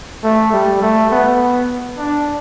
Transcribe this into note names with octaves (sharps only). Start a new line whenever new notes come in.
A3
G3
A3
B3
D4